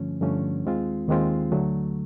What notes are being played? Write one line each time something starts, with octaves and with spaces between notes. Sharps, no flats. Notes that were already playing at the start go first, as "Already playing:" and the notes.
Already playing: G2 D3 F3 A3 C#4
G2 D3 F3 A3 C#4
D#2 D#3 G#3 C4 F4
D#2 D#3 G#3 C4 F4
D2 D3 F#3 A3